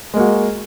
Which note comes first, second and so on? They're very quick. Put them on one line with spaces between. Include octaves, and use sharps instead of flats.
G#3 A#3 F#4